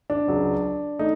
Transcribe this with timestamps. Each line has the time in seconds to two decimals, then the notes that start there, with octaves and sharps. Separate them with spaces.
0.10 D4
0.27 C#2 C#3 F#3
0.99 A3 D#4